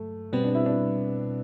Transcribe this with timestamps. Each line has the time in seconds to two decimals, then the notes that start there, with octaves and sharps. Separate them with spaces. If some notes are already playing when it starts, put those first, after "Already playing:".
Already playing: G2 D3 F#3 A3
0.33 B2 G3 B3 C4
0.44 D4
0.55 E4
0.66 D4